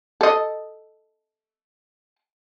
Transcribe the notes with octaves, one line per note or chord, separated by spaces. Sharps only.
A4 D#5